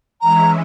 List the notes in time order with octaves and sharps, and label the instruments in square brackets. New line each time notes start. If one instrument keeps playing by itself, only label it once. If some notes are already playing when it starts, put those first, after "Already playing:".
[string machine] E3 G#3 C#4 E4 [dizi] A#5